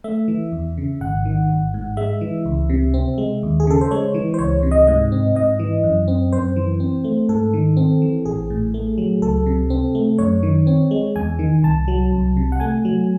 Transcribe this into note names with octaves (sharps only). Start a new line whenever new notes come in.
A3 E5
E3
E2
C#3
G#1 F#5
D#3
G#1
G#2
G#3 E5
E3
C#2
C3
C4
G#3
D#2
G#4
C#3 A4
C5
G#3 C#5
E3
C5
C#2 C#5
C3
D#5
G#2 D#5
C4
G#2 D#5
E3
F#2
C4
F#2 C5
E3
C4
A3
G#2 A4
D#3
C4
E3
A1 G#4
A2
A3
F#3
C#2 A4
C3
C4
A3
F#2 C#5
D#3
C4
G#3
E2 G#5
D#3
C2 A5
F#3
C2
C3
F#5
A3 G#5
F#3